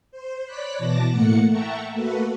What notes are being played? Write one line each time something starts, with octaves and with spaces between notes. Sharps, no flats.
C5
C#5 D5 B5 F#6 B6
B2 E3 A5 D6 A#6
A2 A3 A#3 F#5 C#7
E5 F#5 G5 A5 A#5 C#6
A3 A#3 F#4 A4 B4